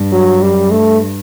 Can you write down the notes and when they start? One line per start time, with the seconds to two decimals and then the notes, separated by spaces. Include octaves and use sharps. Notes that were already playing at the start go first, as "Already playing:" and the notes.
Already playing: G2
0.12 F#3
0.42 F#2 G3
0.71 G2 A3